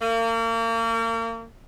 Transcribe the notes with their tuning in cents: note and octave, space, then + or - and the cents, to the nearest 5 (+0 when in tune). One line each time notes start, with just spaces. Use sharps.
A#3 -35